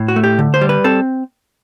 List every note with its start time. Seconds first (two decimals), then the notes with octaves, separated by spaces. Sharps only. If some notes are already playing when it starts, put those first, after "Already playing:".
Already playing: A2
0.08 F#4
0.16 A3
0.23 G4
0.39 D3
0.54 C5
0.61 G3
0.69 B4
0.84 C4 A4